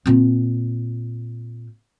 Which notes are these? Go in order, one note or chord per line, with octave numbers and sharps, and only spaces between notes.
A#2 C4